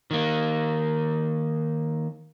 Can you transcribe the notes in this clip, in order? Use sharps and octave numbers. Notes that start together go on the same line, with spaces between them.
D#3 A#3